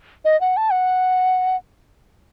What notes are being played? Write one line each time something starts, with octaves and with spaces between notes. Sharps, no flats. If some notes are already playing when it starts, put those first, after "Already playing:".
D#5
F#5
A5
F#5